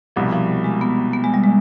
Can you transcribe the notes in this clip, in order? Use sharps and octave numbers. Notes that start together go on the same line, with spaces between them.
C2 B2 F3 G3
F3
G#3
B3
B3
G#3
G3
G#3